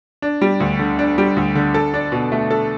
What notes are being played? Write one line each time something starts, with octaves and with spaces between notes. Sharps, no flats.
D4
G3
D2
D3
D4
G3
D2
D3
A4
D4
B2
A3
A4